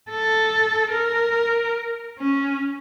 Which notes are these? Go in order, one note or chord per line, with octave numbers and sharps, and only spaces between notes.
A4
A#4
C#4